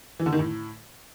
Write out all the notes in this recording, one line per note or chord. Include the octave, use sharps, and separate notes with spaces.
E3
D3
D#3
A2